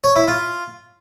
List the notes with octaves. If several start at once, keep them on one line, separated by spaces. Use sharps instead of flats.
C#5
E4
F4